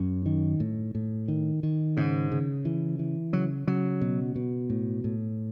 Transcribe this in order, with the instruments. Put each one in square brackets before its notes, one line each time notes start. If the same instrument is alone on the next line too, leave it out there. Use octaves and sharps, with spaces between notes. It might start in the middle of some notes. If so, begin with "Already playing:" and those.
Already playing: [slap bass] F#2 [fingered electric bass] C#4
[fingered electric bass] D#3
A2
A2
D#3
D#3
[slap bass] G#2 [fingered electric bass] C#3
[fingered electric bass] C#3
E3
E3
[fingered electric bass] C#3 [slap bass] F#3
[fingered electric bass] C#3 [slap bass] F#3
[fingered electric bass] B2
B2
A2
A2